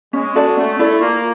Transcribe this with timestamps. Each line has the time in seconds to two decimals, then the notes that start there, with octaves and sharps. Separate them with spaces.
0.13 G#3 C#4
0.35 F#4 A4 D5
0.57 A3 C#4
0.79 E4 A4 D5
1.01 A#3 F4